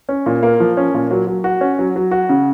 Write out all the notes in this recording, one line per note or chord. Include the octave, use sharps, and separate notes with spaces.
C#4
A#2
A#3
F3
C#4
A#2
F#3
F#3
F#4
C#4
F#3
F#3
F#4
C#3